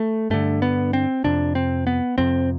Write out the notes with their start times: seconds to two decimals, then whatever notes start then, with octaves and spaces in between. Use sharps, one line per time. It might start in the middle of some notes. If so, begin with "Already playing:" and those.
Already playing: A3
0.30 G2 D3 A3
0.62 B3
0.93 C4
1.24 F2 C3 D4
1.55 C4
1.87 B3
2.18 F2 C3 C4